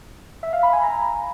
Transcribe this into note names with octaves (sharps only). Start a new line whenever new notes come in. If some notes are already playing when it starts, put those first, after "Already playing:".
E5
F5
B5
G#5
A#5